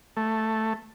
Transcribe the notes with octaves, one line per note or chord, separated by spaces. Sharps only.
A3